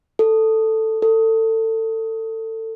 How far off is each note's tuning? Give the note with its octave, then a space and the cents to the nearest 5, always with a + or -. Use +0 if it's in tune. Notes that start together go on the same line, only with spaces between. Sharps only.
A4 +5
A4 +25